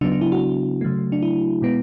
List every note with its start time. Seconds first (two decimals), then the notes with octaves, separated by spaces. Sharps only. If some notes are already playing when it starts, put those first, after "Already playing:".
0.01 C#3 F#3 B3 D4
0.12 D4
0.21 E4
0.32 F#4
0.81 C#3 F#3 A3
1.12 D4
1.22 E4
1.62 B2 G#3 B3